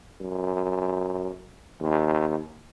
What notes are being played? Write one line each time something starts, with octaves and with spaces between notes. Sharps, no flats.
F#2
D#2